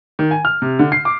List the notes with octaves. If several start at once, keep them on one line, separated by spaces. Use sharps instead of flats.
D#3
G#5
F6
C3
D3
C7
D6